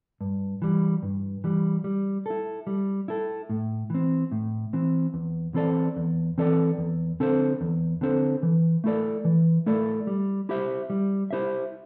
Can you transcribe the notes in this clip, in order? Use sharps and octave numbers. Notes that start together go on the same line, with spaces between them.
G2
E3 G3
G2
E3 G3
G3
E4 A4
G3
E4 A4
A2
E3 C4
A2
E3 C4
E2
E3 C4 A4 D5
E2
E3 C4 A4 D5
E2
D3 C4 A4 C5
E2
D3 C4 A4 C5
E3
A3 E4 A4 D5
E3
A3 E4 A4 D5
G3
E4 G4 C5 E5
G3
E4 G4 C5 E5